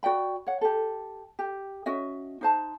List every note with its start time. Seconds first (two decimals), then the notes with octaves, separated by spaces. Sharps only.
0.03 F#4 D5 G5 B5
0.47 C#5 F#5
0.61 G4 A4
1.39 G4
1.86 C#4 F#4 D#5 E5
2.41 D#4 C5 A5